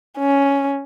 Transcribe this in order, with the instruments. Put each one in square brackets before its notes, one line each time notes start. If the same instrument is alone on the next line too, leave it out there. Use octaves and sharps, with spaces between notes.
[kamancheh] C#4